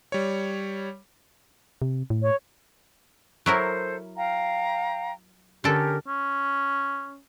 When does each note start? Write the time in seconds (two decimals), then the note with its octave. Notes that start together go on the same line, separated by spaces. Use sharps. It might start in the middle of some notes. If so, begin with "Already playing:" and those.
0.12 G3 C#5
1.82 C3
2.10 A2
2.22 C#5
3.46 F#3 E4 A4 A#4 C5
4.16 F5 G5 A#5
5.64 D3 C#4 G4 A4 A#4
6.08 C#4